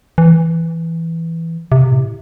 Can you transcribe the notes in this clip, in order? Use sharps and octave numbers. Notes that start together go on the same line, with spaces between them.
E3
C3
A2